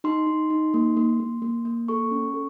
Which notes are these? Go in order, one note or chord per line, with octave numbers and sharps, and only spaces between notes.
D#4 C6
D#4
D#4
A#3
A#3
A#3
A#3
A#3
A4 C#6
C#4
A4